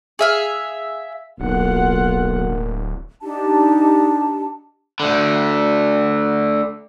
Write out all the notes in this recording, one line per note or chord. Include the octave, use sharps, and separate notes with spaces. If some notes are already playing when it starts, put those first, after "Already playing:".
G#4 E5 F5
D1 B1 A#3 F4 F#5
D4 D#4 G4 A5
D2 D3